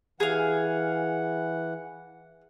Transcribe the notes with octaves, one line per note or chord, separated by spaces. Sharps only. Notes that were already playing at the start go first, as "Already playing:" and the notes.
E3 G#4 F5 F#5